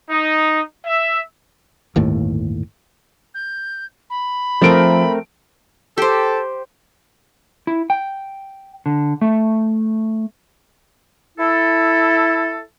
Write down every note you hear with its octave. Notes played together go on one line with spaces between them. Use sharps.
D#4
E5
G1 D#2 A2
G6
B5
F3 A3 C4 A#4 D7
G4 A4 C5
E4
G5
D3
A3
E4 A4